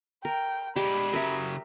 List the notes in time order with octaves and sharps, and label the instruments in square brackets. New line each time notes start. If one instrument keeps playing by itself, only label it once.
[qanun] A#4 [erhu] G5
[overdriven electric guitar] G#3 D4 [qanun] G4 [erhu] B5
[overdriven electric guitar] C#3 F#3 [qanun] A#4 E5